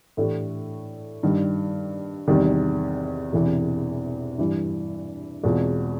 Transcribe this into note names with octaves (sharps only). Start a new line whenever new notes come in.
A2 E3 A3 D4 G4
G2 D#3 G3
E2 C3 D#3 G3
E1 E2 C3 E3
G2 E3 G3
E2 B2 G#3 C4 F4